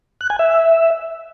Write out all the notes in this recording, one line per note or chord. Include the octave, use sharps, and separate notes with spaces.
F#6
G#5
E5